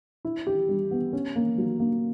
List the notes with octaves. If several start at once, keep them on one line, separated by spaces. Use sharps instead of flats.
E4
G4
G3
B3
C#4
A#3
F#3
A#3